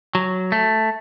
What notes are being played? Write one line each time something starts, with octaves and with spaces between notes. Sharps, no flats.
F#3
A3